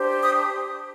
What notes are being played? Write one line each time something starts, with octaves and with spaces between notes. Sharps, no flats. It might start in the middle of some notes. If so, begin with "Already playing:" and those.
Already playing: D4 G4 C5
D#6